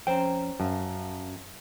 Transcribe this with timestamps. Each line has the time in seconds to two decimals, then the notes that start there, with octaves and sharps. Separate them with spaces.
0.07 F2 C#4 C5 G5 A#5
0.60 F#2 F5 A5